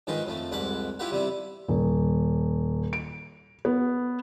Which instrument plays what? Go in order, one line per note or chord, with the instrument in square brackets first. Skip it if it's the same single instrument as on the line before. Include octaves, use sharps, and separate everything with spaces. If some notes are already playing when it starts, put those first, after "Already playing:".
[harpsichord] G#2 D#3 F3 G#3 B4 C6
F2 F3 A3
C2 F2 G#2 F#5 B5 D6
E4 F4 G4 B4 F#5
C3 G3 E4
[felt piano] D#1
D7
B3